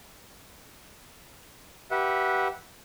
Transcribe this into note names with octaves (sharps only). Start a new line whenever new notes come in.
G4 B4 E5 F#5